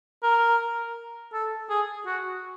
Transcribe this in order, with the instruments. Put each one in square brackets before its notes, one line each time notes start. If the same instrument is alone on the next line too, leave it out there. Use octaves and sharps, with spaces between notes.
[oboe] A#4
A4
G#4
F#4